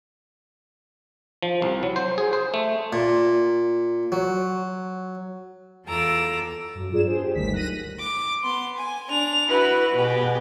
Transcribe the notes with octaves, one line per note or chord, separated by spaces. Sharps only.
F3
C2
F#3
C5
G#4
C5
A3
A#2
F#3
E2 F4 A4 A#5 D6 E6
F#2
G2 F4 G#4 D5 E7
B3 D4 G#4 C5
G4
G1 D2 D#3 F#3 G3 B6
F#6 A#6 D#7
D6
B3 C6
G#5
D4 F7
E4 F#4 B4
B2 G4 G#4